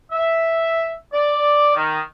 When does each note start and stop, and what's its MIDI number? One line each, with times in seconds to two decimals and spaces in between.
0.12 0.92 76
1.13 1.74 74
1.76 1.99 51